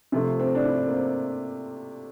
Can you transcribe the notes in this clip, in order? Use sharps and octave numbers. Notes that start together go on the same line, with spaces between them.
C3 F3 A3 C4
C4
D4
E4
A#3
C4